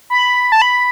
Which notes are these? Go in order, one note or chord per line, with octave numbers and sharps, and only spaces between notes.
B5
A5
B5